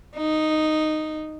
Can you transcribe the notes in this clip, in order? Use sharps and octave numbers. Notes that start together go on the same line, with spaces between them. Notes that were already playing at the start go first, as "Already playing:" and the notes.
D#4